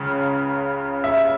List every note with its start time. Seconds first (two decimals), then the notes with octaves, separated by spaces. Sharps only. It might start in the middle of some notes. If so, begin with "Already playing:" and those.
Already playing: C#2 C#3
1.04 E5